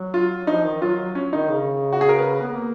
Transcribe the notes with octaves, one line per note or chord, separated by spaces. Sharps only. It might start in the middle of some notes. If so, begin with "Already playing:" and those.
Already playing: F#3
F4
F3 D#4
D#3
F#3 F4
C#4
D#3 D#4
C#3
F#4
G#4
A#4
B4
B3
A#3